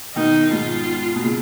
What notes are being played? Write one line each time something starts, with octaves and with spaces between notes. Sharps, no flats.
B2 D#3 D#4
G#2 B2 F4
B2
A#2 C#3